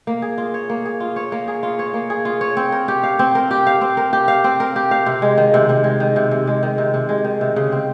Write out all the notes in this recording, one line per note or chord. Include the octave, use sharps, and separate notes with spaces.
A#3
G#4
F4
C#5
A#3
G#4
F4
C#5
A#3
G#4
F4
C#5
A#3
G#4
F4
C#5
C4
A#4
G4
F5
C4
A#4
G4
F5
C4
A#4
G4
F5
C4
A#4
G4
F5
C3
G#3
D#3
C3
C3
G#3
D#3
C3
C3
G#3
D#3
C3
C3
G#3
D#3
C3
C#3
C4